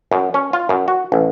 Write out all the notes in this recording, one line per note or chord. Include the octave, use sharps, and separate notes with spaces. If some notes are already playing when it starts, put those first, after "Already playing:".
F#2
C#4
F4
F#2
F#4
A1